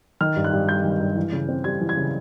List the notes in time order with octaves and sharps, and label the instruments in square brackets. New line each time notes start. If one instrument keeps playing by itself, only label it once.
[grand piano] D#3 F6
G2
F#6
G2
G3 G6
D#3
G2
E3
C#3
C4
G3 G#6
E3
G#6
C#3